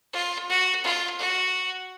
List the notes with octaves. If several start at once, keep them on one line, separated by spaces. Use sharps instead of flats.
F4
F#4
F4
F#4